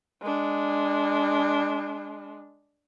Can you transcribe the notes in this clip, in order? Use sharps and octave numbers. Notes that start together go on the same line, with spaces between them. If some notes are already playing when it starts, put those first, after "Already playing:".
G#3 D4